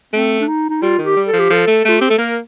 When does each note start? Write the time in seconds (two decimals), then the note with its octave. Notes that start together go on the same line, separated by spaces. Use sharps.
0.13 A3 C4
0.41 D4
0.48 D#4
0.69 D#4
0.82 G3 F4
0.99 D#3
1.05 G4
1.16 G3
1.27 A4
1.33 F3
1.39 G4
1.50 F3 A4
1.68 A3
1.85 A3 F4
1.99 C4 G4
2.08 A3 A4
2.18 A#3 A#4